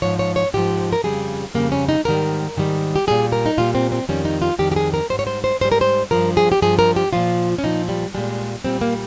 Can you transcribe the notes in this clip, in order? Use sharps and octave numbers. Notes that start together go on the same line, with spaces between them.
G#2 F3 C#5
C#5
C#5
G#2 F3 G4
A#4
F2 C#3 G3 G#4
F2 C#3 G3 A#3
C#4
D#4
G#2 D#3 G3 A#4
G#2 D#3 G3
G4
A#2 G3 G#4
A#4
D#4
A#2 G3 F4
C4
C4
F2 D#3 G3 C#4
D#4
F4
F2 D#3 G3 G4
G4
G#4
A#4
G#2 G3 C5
C#5
C5
C5
G#2 G3 C5
A#4
C5
G2 F3 A#4
G#4
G4
G2 F3 G#4
A#4
G4
A#2 F3 F4
C#4
A#2 F3 D#4
G3
A#2 G3 G#3
A#2 G3 C4
A#3